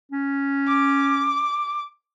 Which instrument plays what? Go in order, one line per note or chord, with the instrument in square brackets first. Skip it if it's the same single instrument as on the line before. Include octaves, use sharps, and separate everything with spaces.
[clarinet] C#4
[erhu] D6